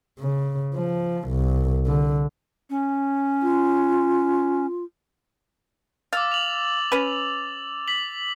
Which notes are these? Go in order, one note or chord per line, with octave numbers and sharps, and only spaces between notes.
C#3
F3
C2
D3
C#4
F4
F5 D6 E6 A6
F7 F#7
C#4 B4
B6 F#7